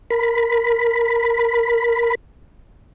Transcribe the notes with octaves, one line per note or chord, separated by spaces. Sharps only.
A#4 B5